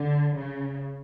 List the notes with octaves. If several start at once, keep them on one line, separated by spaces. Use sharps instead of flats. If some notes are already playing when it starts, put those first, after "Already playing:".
Already playing: D3
C#3